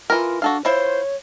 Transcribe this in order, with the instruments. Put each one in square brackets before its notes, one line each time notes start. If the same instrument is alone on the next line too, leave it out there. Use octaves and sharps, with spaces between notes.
[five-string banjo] E3 A#4 [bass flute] F4
[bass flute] D4 [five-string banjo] F#4 A4 F5
[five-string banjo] E4 F4 [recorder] C5 [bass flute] C#5